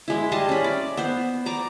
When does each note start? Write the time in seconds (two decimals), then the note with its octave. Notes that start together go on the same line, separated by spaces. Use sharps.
0.08 G#3 E4
0.32 G3 D#5 A5 C6
0.49 C#4 B5
0.64 D5
0.97 B3 C5
1.46 D5 A#5 D6